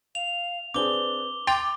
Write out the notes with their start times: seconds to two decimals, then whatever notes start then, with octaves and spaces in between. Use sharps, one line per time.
0.15 F5 F7
0.74 C4 D4 G#4 B4 D6 G7
1.47 G5 C6 D6 A6 F7